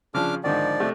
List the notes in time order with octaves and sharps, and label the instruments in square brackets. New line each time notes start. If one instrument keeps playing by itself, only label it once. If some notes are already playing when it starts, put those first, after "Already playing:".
[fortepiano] C#3 F3 [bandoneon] D4 D6 F6
[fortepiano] G#2 D3 D#3 [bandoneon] F3 D5
[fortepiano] C3 A3